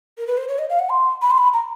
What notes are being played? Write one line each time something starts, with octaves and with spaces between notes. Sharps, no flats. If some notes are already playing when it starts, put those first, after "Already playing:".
A#4
B4
C5
C#5
D#5
F5
F#5
C6
B5
C6
B5
A#5